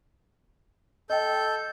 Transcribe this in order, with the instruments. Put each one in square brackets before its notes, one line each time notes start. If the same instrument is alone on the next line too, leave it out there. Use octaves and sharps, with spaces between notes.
[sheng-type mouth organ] A4 G6 [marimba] D#5 G5